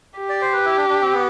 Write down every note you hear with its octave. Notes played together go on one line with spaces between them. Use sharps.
G4
D5
C5
B4
E4
D4
D4
C4
B3